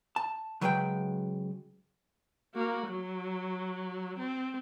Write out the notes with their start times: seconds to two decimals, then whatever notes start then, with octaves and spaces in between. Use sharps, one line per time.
0.16 A5
0.61 C#3 F#3 G#3 B4 E5 G5
2.55 A#3 F#4
2.87 F#3
4.19 C4